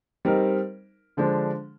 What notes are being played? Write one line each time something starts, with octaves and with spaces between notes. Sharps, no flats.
G3 C4 D#4 A#4
D3 F3 G#3 D4